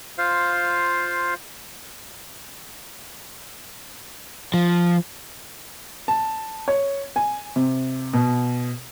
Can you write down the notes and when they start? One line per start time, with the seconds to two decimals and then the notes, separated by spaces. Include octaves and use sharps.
0.18 F4 C5 F5
4.54 F3
6.08 A5
6.68 C#5
7.16 G#5
7.56 C3
8.13 B2